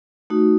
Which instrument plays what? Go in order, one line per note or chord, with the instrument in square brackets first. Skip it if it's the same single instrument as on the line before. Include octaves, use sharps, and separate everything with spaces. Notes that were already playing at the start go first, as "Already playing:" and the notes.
[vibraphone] A3 D#4 F#4